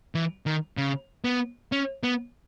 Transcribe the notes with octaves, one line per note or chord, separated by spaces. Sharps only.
E3
D#3
C#3
B3
C#4
B3